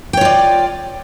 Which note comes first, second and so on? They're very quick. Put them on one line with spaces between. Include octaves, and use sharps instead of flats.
G5 C#5 F4 D5